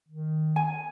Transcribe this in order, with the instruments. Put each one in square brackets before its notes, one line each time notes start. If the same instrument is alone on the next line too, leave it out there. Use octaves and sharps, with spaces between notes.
[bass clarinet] D#3
[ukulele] G#5